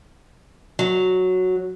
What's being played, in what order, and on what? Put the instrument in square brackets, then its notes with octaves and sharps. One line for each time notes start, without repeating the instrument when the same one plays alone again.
[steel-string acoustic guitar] F#3